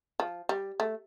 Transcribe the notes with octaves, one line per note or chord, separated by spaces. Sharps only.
F3
G3
A3